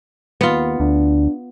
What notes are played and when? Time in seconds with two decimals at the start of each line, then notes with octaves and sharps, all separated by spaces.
0.41 D#2 B3 F4
0.80 D2 D4